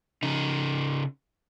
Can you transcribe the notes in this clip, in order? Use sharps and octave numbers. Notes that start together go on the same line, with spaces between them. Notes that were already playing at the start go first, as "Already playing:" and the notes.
C#3 D#4